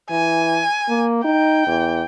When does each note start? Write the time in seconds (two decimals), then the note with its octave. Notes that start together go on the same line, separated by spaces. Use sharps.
0.10 E3 G#5
0.89 A#3
1.24 D#4 G5
1.67 E2